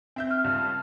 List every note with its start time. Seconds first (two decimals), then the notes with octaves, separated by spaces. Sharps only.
0.16 C4 E5 G6
0.31 F6
0.44 C#2 G2